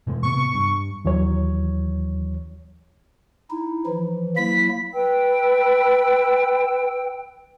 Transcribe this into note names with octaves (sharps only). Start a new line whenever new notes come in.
B2 E3 G#3
A2 C3 B3 C#6
G2
D#2 E3 F#3 C#5
D#4 E4
E3 F3
F#3 A#3 E4 B6
B4 G5 E6